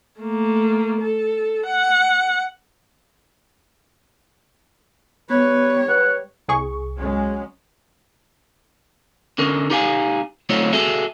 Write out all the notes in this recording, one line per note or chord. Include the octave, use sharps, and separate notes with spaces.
A3 A#3
A4
F#5
G3 B3 B4 C#5
B4 F#5
C2 G#4 C#6
F#3 G#3 C#4
D3 C#4 A#4
D#4 G4 F5 G#5
F#3 A3 C4 D#4 F4 C#5
F#4 G#4 A4 E5